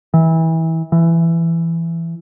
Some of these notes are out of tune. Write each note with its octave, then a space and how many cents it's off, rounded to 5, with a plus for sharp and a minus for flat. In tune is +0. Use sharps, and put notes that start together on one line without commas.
E3 -25
E3 +15